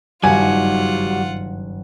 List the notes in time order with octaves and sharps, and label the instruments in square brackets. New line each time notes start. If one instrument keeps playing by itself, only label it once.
[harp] F#1 G2 D#3 [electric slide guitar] G3 F#4 [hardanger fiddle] F4 F#5 [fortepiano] G#5